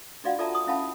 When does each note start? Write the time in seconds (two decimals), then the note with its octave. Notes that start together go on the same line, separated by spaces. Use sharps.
0.24 D4 F4 F#4 D5 F5 F#5
0.39 F4 A4 D5 E5 A5 A#5
0.55 D#6
0.67 C#4 E4 F5 F#5 A5 B5